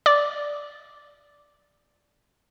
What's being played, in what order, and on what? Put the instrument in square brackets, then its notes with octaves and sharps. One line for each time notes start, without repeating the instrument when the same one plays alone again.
[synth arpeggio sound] D5 D6